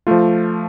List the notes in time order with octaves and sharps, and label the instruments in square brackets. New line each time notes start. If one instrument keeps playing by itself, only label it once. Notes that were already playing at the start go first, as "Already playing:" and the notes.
[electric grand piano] F3 A3 F4